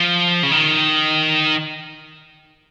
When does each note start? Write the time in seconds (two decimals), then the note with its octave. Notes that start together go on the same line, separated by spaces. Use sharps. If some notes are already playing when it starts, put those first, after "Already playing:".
Already playing: F3
0.43 C#3
0.51 D#3